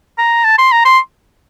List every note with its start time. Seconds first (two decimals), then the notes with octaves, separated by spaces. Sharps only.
0.18 A#5
0.45 A5
0.58 C6
0.72 A#5
0.85 C6